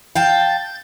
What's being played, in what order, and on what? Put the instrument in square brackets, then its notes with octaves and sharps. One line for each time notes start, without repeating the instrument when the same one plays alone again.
[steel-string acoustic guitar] F5 G5 A5 [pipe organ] G6 A6